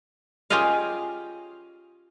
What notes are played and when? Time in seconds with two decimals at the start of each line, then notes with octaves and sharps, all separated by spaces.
0.50 C#4 F4 G4 G#4 D#5 F5